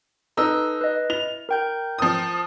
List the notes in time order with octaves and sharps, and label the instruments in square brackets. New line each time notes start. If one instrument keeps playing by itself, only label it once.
[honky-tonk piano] D#4 E6 [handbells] A4 B4
[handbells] B4 D#5
[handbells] E4 [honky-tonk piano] F7
[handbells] A#4 G5 G6
[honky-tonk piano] F3 D#6